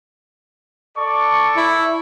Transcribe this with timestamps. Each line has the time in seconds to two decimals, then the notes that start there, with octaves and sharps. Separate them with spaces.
0.96 A4 D5 C#6
1.56 E4